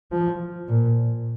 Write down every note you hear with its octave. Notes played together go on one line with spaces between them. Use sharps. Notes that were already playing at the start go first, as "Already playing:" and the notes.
F3
A#2